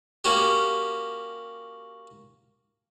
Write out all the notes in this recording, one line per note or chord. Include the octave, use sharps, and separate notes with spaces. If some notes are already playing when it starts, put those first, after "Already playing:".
A#3 C#4 F#4 G4